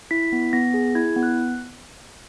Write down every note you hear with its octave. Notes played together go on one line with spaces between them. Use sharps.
E4 B6
B3
B3 A#6
G#4
E4 G#6
B3
F#6